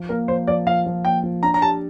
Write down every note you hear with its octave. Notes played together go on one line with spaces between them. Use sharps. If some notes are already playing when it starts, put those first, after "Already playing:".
Already playing: F3
A#3 A#4
F3 C5
F3 D5
F3 F5
F3
A#3 G5
F3
D4 A#5
A#5
G4 A5